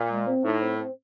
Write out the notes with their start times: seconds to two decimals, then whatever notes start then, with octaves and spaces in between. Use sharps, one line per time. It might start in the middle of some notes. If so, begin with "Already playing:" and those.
Already playing: A#2
0.10 G#3
0.26 C4
0.44 A2 D#4
0.61 C4
0.79 C4